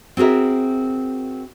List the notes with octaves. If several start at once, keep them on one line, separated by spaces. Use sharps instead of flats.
C4 F#4 G#4 A#4 E5